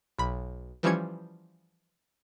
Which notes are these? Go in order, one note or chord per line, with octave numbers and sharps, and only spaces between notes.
B1 B5
E3 F3 G3 C#4 G#6 C#7